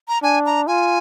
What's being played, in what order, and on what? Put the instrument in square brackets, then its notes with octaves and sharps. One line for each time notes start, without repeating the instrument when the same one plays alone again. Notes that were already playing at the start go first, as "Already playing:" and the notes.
[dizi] A#5
[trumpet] D4 [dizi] G#5
[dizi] A#5
[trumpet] F4 [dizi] G#5